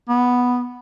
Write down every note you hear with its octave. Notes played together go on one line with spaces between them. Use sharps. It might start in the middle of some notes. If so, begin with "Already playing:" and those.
B3